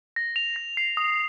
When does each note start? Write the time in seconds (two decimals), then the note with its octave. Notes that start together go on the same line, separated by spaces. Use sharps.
0.16 A#6
0.36 F7
0.56 A#6
0.77 C7
0.97 D#6